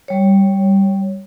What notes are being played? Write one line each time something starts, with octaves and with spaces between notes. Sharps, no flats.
G3 C#5